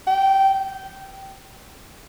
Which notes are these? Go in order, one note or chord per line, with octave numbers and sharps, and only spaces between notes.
G5